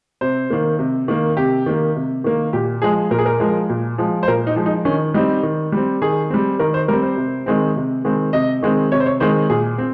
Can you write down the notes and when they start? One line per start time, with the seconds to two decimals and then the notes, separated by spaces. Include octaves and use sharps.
0.21 C3 C5
0.50 D#3 A#3
0.79 C3
1.08 D#3 A#3
1.37 C3 G4
1.66 D#3 A#3
1.96 C3
2.24 D#3 A#3
2.53 A#2 G4
2.82 F3 G#3 G#4
3.11 A#2 A#4
3.19 G#4
3.26 A#4
3.40 F3 G#3
3.69 A#2
3.98 F3 G#3
4.23 C5
4.28 A#2 A#4
4.47 D#4
4.56 F3 G#3
4.66 D#4
4.85 D#3 C#4
5.14 G3 C4 D#4
5.43 D#3
5.72 G3 C4
6.02 D#3 G#4
6.30 G3 C4
6.59 D#3 A#4
6.74 C5
6.88 G3 C4 A#4
7.03 C5
7.17 C3
7.46 D#3 G#3 C4
7.76 C3
8.05 D#3 G#3 C4
8.33 C3 D#5
8.63 D#3 G#3 C4
8.92 C3 C#5
9.00 C5
9.06 C#5
9.20 D#3 G#3 C4 C5
9.50 A#2 G#4
9.78 C4